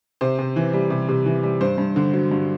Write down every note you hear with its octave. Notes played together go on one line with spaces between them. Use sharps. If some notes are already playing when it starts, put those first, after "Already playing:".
C3 C5
C3
E3
G3
C3
C3
E3
G3
G2 C5
G2
D3
F#3
G2